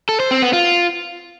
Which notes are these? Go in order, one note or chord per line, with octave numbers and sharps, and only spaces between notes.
A4
C5
C4
B3
F4